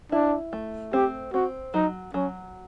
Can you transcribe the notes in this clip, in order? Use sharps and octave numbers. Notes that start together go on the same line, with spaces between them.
D4 E4
A3
C4 G4
C4 F#4
F#3 D#4
F#3 C#4